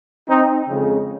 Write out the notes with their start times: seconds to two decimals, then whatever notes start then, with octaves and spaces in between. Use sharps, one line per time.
0.28 C4 D#4
0.69 F2 C#3 G#3